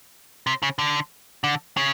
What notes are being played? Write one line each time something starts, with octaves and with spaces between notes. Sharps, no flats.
C3
C#3
D3
D3
C#3